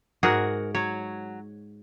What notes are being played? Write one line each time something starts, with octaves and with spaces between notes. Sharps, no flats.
G#2 F#4 G#4 A#4 F#5
F#3 C#5